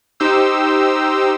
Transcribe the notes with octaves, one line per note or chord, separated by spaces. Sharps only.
D#4 G4 C5 E6